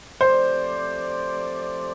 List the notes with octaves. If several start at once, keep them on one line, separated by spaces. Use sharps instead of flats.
F3 A3 C4 G4 C5 D5